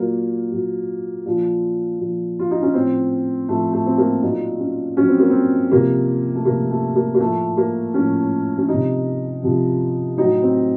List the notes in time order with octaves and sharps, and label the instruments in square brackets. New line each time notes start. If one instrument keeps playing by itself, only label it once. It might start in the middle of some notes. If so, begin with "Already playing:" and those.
Already playing: [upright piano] A#2 F#3 A#3
A#2 F#3
A#2 F3
A#2 F3
F4
D#4
C#4
A2 F3 C4
A2 F3 A3
A3
C4
A#3
A#2 F#3 D#4
C#4
A#2 F#3 C#4
C4
A#3
C4
C3 F3 A#3
A3
C3 F3 A#3
A3
A#3
A#3
A2 F3 A3
A#3
A2 F3 C#4
C#4
C3 F3 D#4
C3 F3
A2 F#3 D#4
C4